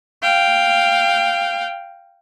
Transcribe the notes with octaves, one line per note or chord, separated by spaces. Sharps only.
F5 G5